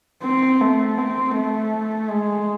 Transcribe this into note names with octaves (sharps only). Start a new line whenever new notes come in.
C4
A3
C4
A3
G#3